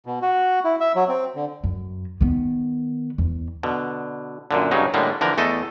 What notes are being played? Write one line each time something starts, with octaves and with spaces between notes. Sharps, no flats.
B2
F#4
E4
E5
F#3
C4
D3
F#2
D#3 B3
E2
B2 D3
F#2 A#2 D3
G2 C#3 F#3 D#4
A2 D3 G3 G#3 A#3
D3 E3 F3 A#4
E2 A3 A4 D#5